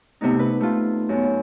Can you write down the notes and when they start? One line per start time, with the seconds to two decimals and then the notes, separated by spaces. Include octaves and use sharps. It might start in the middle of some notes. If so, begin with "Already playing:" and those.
0.21 C3 A3 B3 D#4
0.39 B4
0.60 A3 F4
1.09 F#2 B3